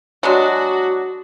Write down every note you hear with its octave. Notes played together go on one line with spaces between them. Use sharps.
F#3 G#3 D4 F#4